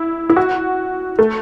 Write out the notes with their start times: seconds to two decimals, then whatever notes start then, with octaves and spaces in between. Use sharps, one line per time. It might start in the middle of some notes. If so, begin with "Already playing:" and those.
Already playing: E4
0.29 E4
0.36 F#4
1.19 A3